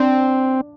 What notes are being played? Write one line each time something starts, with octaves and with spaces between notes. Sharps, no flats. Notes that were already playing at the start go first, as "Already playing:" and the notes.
Already playing: C4 D4 D5